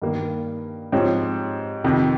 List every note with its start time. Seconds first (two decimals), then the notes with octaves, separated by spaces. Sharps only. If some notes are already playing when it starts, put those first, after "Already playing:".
0.02 G2 D#3 A#3
0.92 G#2 F3 C4 G4 C#5
1.84 F2 C3 D#3